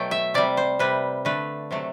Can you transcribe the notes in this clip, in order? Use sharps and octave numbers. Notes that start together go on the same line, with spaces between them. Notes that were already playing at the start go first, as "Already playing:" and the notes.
Already playing: B2 F#3 A3 G5
E5
C3 G3 D5
C5
C3 G3 B4
D3 A3 B4
C3 F#3 A3